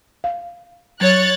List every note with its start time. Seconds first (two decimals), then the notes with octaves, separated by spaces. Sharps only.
0.24 F5
1.01 F#3 C#5 F#6 A6